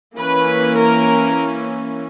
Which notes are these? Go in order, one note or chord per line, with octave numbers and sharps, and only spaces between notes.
E3 A#3 C#4 B4
A#4